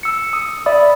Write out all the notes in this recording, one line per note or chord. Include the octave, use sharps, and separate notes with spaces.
E6 C#7
D#6
D5 E5 B5 D#6